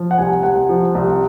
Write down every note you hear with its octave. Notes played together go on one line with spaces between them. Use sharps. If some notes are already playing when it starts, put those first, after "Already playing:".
Already playing: F3
F#5
C2 G#5
C2 F#5
F3
C2